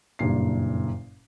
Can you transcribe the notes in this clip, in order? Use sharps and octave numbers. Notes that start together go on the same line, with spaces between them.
F#1 G2 A#2 C7